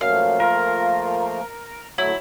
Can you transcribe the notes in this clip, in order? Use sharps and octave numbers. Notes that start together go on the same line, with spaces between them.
F#2 F3 A3 A#3 F5
F4 A#4
A2 D3 F#3 A3 E4